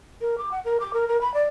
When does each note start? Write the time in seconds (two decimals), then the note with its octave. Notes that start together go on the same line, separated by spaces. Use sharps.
0.21 A#4
0.38 D6
0.51 F#5
0.65 A#4
0.80 D6
0.93 A#4
1.08 A#4
1.21 B5
1.34 D5